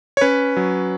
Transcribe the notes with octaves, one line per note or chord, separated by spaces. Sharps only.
C#5
C#4 B4
F#3